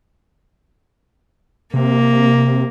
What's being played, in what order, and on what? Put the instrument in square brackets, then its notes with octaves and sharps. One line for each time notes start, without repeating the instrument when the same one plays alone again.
[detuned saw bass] C3 [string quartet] A#3